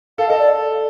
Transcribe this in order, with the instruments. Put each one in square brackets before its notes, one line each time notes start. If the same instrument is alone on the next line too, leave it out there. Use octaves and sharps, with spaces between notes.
[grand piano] A4 [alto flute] F5
[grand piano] A4 [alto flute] D#5
[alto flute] D5